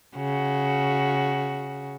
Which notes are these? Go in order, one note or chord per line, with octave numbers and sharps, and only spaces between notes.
C#3 F#4